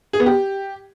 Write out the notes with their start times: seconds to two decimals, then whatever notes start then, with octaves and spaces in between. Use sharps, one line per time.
0.13 G#4
0.20 B3
0.26 G4